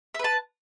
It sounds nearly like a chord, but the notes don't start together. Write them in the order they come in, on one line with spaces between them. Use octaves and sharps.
E5 B4 A5